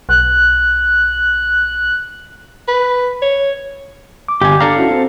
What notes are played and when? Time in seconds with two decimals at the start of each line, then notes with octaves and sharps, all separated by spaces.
0.09 B1 F#6
2.68 B4
3.22 C#5
4.28 D6
4.42 G1 G4 G#5
4.60 D4 A4 F5 A#5
4.76 C#4 E4 F#4
4.91 C4